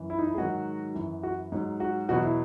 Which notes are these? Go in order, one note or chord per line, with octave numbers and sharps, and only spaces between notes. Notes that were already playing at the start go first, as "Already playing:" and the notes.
Already playing: F#2 E3
E4
D#4
E4
G#4
G#2 D#3 F#3 F#4
F#2 E3
F#4
G#2 F#3
F#4
E2 B2 F#3 F#4
E4